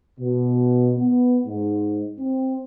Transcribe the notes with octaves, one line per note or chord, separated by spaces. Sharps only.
B2
B3
G#2
C4